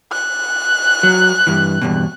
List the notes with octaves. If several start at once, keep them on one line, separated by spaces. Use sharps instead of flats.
F#6
F#3
G2 E3
E2 G2 B2